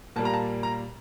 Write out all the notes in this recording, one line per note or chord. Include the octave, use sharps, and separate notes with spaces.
A#2 G3 A#3 A5
A#5
A5
A#5